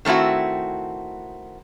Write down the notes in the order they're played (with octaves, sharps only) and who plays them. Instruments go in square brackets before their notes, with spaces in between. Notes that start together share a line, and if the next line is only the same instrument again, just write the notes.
[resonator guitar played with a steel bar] D#3 A3 C4 E4 F#4